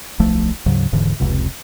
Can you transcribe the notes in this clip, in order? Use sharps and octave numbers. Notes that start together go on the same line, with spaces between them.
D1 B1 F3 A3
D2 G#2 C#3 F#3
D#1 G#2 D3 E3
F1 C#2 C3